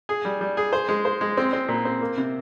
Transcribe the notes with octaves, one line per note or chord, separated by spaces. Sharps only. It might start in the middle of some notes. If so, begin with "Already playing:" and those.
G#4
G3
G3
G#4
C5
G#3
C5
G#3
C4
C4
A#2
C4
A#3
C3